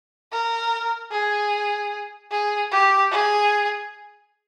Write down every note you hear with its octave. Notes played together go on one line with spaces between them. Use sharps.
A#4
G#4
G#4
G4
G#4